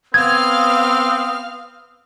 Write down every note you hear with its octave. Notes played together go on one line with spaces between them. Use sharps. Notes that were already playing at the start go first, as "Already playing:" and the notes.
B3 C4 F5 D#6 F6 G#6